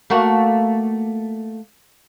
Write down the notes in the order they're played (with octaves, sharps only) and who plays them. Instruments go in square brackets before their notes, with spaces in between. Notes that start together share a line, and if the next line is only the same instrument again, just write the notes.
[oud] A3 A#3 F#4